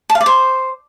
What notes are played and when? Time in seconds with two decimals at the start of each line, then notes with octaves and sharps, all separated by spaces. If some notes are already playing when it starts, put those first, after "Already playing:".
0.10 A5
0.15 F5
0.21 D5
0.26 C5